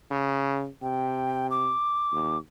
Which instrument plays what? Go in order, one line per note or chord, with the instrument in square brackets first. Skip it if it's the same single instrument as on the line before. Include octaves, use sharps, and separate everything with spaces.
[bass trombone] C#3
[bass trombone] C3 [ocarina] G5
[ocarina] D6
[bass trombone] D#2